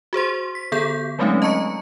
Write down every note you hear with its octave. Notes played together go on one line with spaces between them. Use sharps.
F#4 G#4 C5 C6
B6
D3 B3 G#4 A4 G6
F#3 G#3 A3 C4 C#4 D#4
D#5 A5 A#5 C#6 C#7